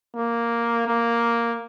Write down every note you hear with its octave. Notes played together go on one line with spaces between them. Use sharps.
A#3
A#3